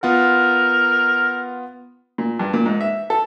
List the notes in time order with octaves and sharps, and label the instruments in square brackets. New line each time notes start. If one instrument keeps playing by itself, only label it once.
[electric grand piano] B3 F4 F#5 [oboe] A#4
[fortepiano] A#2
G2
A#2
G#2
E5
A4